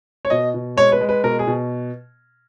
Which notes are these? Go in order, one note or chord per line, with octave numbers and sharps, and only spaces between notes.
C#5
B2 D#5
B2
G#3 C#5
B4
G#3
B4
B2 A#4
G#4
B2